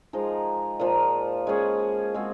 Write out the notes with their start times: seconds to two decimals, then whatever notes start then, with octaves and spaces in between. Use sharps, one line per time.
0.13 F3 G#3 D#4 A#4
0.79 A#2 F3 A#3
1.47 G#3 C#4 G#4
2.14 G#3 C4 F#4